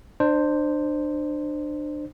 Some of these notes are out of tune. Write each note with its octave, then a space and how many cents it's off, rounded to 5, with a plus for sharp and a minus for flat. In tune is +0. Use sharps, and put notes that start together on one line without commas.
D4 +30 C5 +0